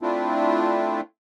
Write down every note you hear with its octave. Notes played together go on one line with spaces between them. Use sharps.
A3 C4 D4 E4 F4